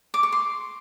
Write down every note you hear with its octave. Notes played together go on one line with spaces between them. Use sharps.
D6
C#6
C6